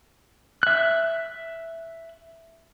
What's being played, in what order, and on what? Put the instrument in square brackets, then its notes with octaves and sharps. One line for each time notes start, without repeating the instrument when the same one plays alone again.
[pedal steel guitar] E5 F#6